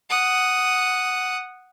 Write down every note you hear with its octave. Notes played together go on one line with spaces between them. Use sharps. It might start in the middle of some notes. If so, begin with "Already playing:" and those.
F#5 D#6